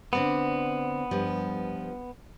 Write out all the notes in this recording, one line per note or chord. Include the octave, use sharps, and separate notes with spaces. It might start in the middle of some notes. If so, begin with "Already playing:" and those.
D3 B3 C4 D5
G2 F3 G3